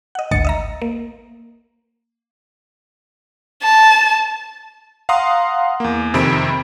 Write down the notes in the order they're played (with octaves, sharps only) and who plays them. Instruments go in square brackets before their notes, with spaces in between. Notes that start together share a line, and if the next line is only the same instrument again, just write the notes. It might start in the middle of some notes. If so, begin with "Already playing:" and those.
[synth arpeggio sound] D#5 F#5
G#1 D2 D#5 A6 C#7
D#5 E5 A#5
A#3
[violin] A5
[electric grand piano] F5 F#5 A#5 C6 D#6
E2 A#3
F2 C3 D#3 B5 E6 D7